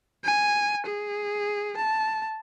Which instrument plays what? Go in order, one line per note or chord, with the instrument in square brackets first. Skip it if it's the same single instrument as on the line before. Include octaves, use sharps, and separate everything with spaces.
[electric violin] G#5
G#4
A5